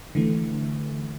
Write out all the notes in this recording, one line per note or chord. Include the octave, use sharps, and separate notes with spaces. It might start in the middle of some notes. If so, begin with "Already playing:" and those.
D3 E3 A3